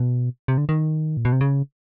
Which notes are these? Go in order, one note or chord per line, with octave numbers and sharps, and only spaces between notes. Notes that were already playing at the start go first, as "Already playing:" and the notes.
Already playing: B2
C3
D3
D#3
A#2
B2
C3
C#3